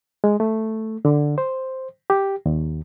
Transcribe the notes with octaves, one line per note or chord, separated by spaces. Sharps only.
G#3
A3
D3
C5
G4
D#2